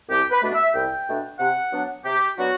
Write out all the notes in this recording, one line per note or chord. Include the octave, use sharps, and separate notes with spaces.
C2 G4
B4
B2 A3 D4
E5
C2 G5
B2 A3 D4
C3 F#5
F#3 B3 D4
C3 G4
F#3 B3 D4 F#4